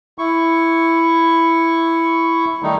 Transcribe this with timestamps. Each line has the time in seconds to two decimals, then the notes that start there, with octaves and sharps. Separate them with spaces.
0.18 E4 C#6
2.63 D#3 G3 A3 D#4